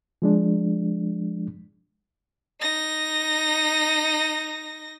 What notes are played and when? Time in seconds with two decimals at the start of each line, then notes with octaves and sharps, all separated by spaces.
0.22 F3 G#3 D4
2.60 D#4 A#6